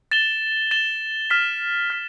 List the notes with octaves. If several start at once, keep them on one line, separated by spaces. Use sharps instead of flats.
A6 E7 G7
A6 E7 G7
F6 B6 E7
F6 B6